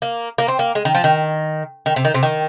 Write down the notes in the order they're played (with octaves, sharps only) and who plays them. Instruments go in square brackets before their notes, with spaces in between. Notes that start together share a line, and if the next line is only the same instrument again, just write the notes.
[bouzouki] A#3
A#3
C4
A#3
G#3
D#3
F3
D#3
D#3
C3
D#3
C3
D#3